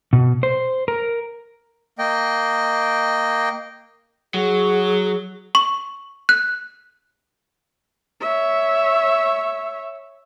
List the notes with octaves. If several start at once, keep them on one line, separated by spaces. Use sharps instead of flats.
B2
C5
A#4
A#3 D#5 G5
F#3 G#4
C#6
F#6
C#5 E5